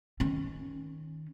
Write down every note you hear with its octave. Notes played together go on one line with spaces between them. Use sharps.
D#3 C#4